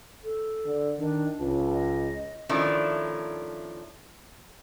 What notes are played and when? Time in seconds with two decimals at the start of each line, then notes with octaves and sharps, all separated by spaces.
0.24 A4
0.65 D3
0.99 D#3 D4
1.40 C#2 A5
1.72 D#5
2.49 D#3 F3 A3 C#4 D4 E4